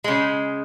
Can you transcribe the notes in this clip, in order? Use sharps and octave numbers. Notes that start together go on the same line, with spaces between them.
C#3 G#3